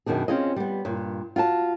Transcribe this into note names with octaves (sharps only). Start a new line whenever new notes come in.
F#2 B2 D#3 D4 G#4
C4 C#4 F4 G#4 D#5
G3 B3
G2 A#2
F4 F#4 G5 A5